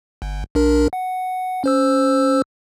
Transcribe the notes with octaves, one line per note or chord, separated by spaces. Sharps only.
G1
B1 D4 A#4
F#5
C#4 C5 E6